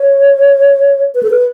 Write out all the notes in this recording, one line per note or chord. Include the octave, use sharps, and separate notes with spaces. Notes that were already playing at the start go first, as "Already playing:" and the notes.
Already playing: C#5
B4
A4
B4